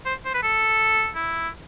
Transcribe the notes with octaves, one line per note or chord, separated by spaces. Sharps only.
C5
C5
B4
A4
E4